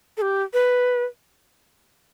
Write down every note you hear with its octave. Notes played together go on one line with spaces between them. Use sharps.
A4
G4
B4